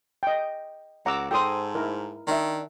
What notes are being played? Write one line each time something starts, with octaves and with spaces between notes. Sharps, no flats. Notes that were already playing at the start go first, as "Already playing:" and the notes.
D#5 G5
C#2 F#5 A#5 D6 E6
G#2 A4 C5 G5 D#6
E4 A#4
D#3 D4 E5